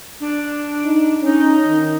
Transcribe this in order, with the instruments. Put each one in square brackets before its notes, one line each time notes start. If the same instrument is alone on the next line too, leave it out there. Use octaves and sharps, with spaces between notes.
[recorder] D4
[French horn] D#4
[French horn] C#4 [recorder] D#4
[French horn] D#3